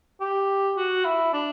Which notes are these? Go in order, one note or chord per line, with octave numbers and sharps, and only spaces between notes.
G4
F#4
E4
D4